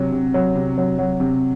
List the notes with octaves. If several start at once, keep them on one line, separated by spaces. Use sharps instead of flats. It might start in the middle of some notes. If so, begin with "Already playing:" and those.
Already playing: C3 F#3
C3
F#3
C3
F#3
F#3
C3